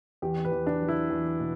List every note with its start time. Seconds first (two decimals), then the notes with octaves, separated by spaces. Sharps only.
0.22 E2 G4
0.45 B4
0.52 E2
0.67 D4
0.81 F#3
0.88 E4
1.10 E2
1.40 B2